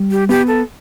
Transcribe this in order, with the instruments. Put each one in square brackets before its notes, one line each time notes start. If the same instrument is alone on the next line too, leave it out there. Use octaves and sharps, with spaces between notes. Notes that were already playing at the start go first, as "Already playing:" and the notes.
Already playing: [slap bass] G3
[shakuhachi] G4
[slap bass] B3 [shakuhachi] G4
[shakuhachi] A4